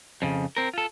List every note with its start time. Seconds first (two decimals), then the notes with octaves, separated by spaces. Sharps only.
0.22 F2 C#3
0.57 C4 A#4
0.74 F4 A4